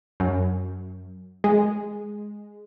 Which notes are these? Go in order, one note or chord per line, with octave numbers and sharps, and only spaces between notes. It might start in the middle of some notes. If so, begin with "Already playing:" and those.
F#2
G#3